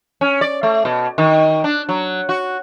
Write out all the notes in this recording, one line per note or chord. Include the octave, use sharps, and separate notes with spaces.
C#4
D5
A3
B2
D#3
D4
F#3
F#4